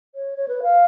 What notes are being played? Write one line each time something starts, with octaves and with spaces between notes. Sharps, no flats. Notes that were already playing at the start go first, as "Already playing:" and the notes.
C#5
C#5
B4
F5